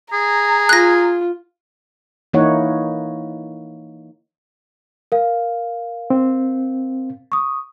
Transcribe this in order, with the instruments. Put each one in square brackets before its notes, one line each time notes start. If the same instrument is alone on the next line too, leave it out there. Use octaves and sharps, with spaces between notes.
[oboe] G#4 [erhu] A#5
[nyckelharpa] F4 [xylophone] F#6 A#6
[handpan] E3 A#3 D#4 E4 C#5 F#5
[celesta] A#4 F5
[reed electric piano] C4
[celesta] C#6 D#6